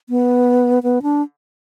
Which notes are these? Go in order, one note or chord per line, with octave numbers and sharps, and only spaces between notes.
B3
B3
D4